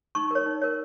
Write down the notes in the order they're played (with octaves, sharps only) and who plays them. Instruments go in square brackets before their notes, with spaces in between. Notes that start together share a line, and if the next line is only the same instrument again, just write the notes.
[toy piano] D#4 C#6
A#4 C#5
D#4
A#4 C#5